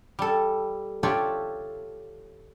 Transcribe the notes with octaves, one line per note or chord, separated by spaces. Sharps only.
G3 A4
F4 G4 A4 C#5 D5 E5